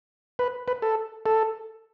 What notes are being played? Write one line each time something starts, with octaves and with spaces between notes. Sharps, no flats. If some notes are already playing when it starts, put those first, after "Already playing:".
B4
B4
A4
A4